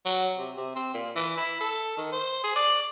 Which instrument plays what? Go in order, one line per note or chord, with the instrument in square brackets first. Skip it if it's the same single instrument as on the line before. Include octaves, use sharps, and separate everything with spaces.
[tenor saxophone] F#3
C3
C3
C4
A#2
E3
E4
A4
D#3
C5
G#4
D5